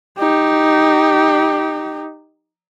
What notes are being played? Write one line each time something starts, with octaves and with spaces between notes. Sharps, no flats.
D#4 G4